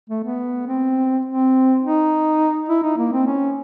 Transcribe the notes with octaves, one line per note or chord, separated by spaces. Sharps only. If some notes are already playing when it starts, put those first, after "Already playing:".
A3
B3
C4
C4
D#4
E4
D#4
A#3
C4
C#4